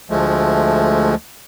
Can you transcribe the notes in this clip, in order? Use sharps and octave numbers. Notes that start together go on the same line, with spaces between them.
D2 F3 G#3 A3